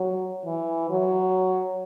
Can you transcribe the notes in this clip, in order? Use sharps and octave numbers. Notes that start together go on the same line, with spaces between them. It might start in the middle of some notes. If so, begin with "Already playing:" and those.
Already playing: F#3
E3
F#3